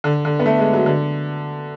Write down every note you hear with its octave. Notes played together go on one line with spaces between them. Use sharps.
D3
D3
B3
A3
G#3
F#3
D3